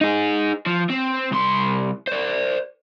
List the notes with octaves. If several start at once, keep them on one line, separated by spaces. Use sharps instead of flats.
D#4 G#4
F3
C4
C2 C6
C5 D5